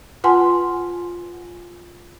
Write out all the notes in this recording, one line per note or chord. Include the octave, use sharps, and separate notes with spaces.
F4 B4 F#5 G#5 A5 C6